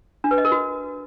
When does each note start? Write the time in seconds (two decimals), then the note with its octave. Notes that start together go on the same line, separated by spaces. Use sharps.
0.24 D4
0.31 B4
0.38 D#5
0.45 A#4
0.52 F#4